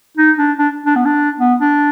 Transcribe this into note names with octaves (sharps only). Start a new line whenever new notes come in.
D#4
D4
D4
D4
B3
D4
B3
D4